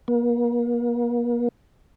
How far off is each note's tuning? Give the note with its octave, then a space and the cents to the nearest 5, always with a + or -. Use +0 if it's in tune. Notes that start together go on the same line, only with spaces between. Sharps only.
A#3 +40